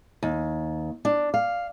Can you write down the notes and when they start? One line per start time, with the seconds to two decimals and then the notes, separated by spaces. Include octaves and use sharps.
0.23 D#2
1.05 D4
1.34 F5